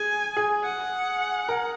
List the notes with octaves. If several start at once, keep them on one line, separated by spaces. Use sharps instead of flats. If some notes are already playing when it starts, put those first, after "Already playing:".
Already playing: G#4 G#5
G#4
F#5
A#4